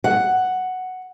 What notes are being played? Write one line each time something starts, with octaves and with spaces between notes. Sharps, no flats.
F#5